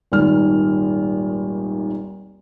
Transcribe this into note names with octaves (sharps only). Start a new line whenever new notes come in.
D#1 G#1 D#3 F6